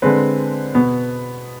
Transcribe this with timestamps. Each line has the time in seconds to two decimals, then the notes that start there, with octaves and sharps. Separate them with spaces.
0.02 D3 G#3 C4 B4
0.75 B2 B3